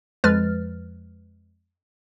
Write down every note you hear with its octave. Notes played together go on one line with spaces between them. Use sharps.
F2 F3 G#3 B4 F6 A6